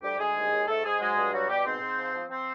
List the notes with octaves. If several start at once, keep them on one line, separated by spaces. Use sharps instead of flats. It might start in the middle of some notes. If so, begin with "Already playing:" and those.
D2 G3 G4
D2 G#3 G#4
D#2
D#2
G#2 A3 A4
G#2 G#3 G#4
F#3 G#3 G#4
G2
F#3 G3 F#4
B2 G3 G4
G#2 C4 C5
G#2
F3
F3
F3 C4 C5